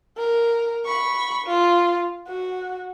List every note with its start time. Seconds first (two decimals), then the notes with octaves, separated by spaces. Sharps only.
0.17 A#4
0.85 B5 C#6
1.47 F4
2.27 F#4